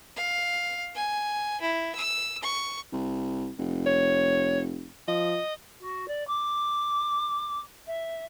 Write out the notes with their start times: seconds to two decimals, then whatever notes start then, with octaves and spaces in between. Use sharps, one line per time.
0.16 F5
0.95 G#5
1.61 E4
1.95 E6
2.43 C#6
2.92 C2
3.59 F1
3.86 C#5
5.08 F3 D#5
5.80 F#4
6.07 D5
6.27 D6
7.86 E5